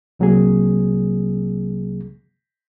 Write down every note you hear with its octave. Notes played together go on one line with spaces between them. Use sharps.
C2 C3 F#3 A#3 C4 G#4